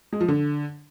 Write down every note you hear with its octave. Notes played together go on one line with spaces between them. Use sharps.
G#3
F3
D3